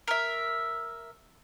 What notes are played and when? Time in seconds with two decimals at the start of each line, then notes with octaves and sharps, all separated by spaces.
0.07 A#4 E5